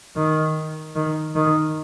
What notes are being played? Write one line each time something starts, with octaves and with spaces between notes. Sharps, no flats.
D#3
D#3
D#3